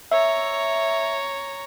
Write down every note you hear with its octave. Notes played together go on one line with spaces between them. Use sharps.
C#5 E5 A#5